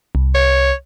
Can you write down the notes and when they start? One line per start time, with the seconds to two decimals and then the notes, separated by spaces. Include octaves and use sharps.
0.15 C2
0.35 C#5